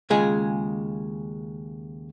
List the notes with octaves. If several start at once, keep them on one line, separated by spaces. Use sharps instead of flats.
D#2 C#3 G#3 F4 G#4